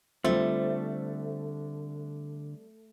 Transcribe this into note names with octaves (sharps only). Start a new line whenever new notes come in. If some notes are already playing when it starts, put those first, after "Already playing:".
D3 G3 A3 C4 F4 C5 E5